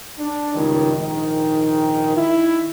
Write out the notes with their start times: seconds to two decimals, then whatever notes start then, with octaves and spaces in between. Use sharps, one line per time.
0.19 D4
0.54 C#2 G2 D#3
0.98 A#1 G#2 D#3
2.17 D#3 E4